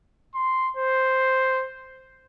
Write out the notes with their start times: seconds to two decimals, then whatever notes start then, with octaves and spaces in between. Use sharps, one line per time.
0.35 C6
0.77 C5